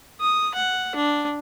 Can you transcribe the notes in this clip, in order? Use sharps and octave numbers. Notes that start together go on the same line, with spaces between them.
D#6
F#5
D4